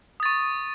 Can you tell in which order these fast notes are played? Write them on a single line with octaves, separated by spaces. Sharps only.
D#6 A6 C#6